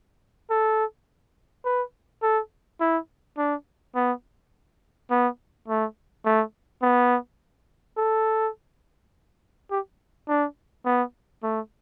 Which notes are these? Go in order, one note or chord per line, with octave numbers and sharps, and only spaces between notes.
A4
B4
A4
E4
D4
B3
B3
A3
A3
B3
A4
G4
D4
B3
A3